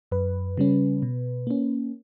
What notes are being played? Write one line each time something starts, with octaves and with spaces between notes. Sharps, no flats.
F#2 B4
C#3 G3 C#4
B2
A#3 C#4